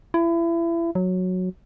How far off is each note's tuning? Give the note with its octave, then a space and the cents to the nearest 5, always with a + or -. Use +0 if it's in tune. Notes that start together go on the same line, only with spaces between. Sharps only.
E4 +30
F#3 -10